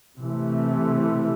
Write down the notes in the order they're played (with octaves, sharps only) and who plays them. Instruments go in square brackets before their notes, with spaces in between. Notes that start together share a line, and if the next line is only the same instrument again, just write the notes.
[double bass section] C3 E3 A3